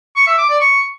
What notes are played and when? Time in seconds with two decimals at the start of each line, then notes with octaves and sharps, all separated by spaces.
0.16 C#6
0.27 E5
0.38 D6
0.49 D5
0.60 C#6